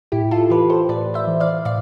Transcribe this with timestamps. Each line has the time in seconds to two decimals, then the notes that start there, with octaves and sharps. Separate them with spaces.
0.12 A2 E4 G4
0.31 F4 A4
0.50 E3 G4 B4
0.70 A4 C5
0.89 A2 B4 D5
1.14 C5 E5
1.27 E3
1.40 D5 F5
1.65 A2 D5 F5